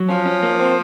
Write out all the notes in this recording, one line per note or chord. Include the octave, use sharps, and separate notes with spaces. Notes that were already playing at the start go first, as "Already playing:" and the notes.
Already playing: F#3
F3 C#4
C#4
A#3
C4